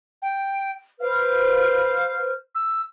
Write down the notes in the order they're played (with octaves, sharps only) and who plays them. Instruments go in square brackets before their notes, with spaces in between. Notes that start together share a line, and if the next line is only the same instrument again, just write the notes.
[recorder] G5
[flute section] B4 C5 F6 [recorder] F5
[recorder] E6